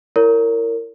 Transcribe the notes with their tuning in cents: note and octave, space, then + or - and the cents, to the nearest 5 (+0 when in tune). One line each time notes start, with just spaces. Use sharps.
E4 +15 A#4 -25 C#5 +35